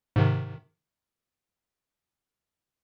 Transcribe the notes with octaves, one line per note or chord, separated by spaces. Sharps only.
G#2 C3 D#3